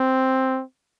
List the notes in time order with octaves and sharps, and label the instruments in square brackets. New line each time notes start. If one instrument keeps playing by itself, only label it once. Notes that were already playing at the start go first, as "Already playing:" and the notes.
Already playing: [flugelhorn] C4